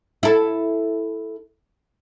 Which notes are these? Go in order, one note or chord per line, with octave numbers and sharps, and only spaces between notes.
E4 A4